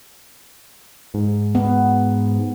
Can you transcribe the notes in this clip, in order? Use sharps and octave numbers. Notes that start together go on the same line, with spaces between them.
G#2
B3